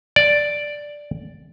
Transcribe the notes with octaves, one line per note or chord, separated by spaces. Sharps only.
D5